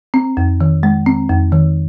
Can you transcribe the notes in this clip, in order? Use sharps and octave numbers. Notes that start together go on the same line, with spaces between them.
C4
F2
D#3
G#3
C4
F2
D#3